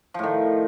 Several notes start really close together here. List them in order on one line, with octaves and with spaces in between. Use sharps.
F3 A2 D#3